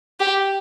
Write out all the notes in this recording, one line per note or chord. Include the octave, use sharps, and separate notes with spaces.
G4